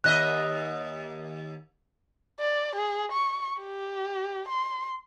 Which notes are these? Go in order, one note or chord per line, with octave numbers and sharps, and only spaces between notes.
D#2 D#5 E5 F#6
D5
G#4
C#6
G4
C6